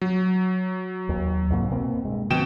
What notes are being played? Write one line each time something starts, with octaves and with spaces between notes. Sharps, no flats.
F#3
D#2
C2 G#2 A#3
B2 A#3 C4
G2 G#3
B2 D3 F3 C4 G5 E7